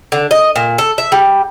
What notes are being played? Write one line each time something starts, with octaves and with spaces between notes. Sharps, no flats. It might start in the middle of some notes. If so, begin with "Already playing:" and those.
D3
D#5
A#2
A4
E5
G3